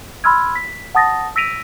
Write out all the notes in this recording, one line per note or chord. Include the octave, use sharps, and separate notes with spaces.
B5 C6 E6 F6 G#6
B6
F#5 A5 D#6 A6 A#6
E6 A#6 B6 D7 D#7 F7